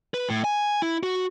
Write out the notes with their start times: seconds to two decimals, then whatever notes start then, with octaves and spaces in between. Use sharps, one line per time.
0.14 B4
0.30 A2
0.44 G#5
0.82 E4
1.03 F#4